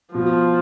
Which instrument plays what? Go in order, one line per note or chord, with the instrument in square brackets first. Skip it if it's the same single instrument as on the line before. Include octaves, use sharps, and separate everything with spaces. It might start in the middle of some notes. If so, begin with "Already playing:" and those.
[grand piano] B2 [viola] F3